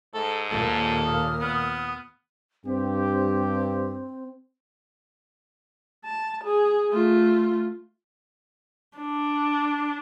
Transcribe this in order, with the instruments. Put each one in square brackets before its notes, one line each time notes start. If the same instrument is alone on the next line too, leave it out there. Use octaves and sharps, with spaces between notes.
[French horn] G#2 [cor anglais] A4
[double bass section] D#2 A#2 A#3 [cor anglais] A4 [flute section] G#5
[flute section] D#6 F6
[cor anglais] B3
[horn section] G2 G4 [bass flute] C4
[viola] A5
G#4
A3 F4
D4